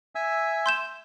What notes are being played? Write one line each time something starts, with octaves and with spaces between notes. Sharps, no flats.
E5 G#5 E6
C6 G6 E7